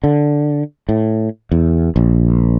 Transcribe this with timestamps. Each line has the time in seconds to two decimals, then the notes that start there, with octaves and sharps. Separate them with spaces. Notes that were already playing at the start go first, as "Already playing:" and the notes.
0.04 D3
0.89 A2
1.51 E2
1.96 A#1